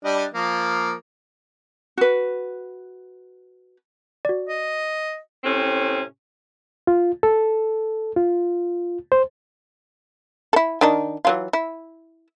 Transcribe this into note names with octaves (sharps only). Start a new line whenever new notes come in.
G3 D4 D#5
F3 A#3
F#4 B4
F#4 D5
D#5
A2 C3 C4 C#4
F4
A4
F4
C5
E4 A4
D#3 D4 D#4
E3 F#3 F4
E4